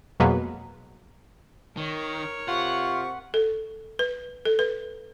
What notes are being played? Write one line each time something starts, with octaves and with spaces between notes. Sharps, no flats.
F2 B2 F#3 G#3 A#3 B3
D#3 A#4 C#5
C3 F4 G4 F#5 C#6
A4
B4
A4
B4